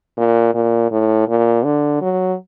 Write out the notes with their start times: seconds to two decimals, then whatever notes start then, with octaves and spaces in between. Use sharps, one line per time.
0.17 A#2
0.55 A#2
0.91 A2
1.28 A#2
1.65 D3
2.02 F#3